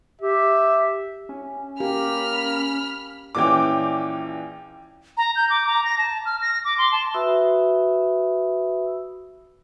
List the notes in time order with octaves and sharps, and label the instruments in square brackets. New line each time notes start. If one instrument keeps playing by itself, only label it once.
[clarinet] G4 [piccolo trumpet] E5
[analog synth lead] C#4
[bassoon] A#3 [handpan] G4 [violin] B5 F6
[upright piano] A#1 E3 C#4 [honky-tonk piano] G5 D6
[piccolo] A#5
G6
D6
A#5
A#6
A5
F6
A#6
D6
C6
A5
[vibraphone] F#4 B4 E5 B5 D#6 E6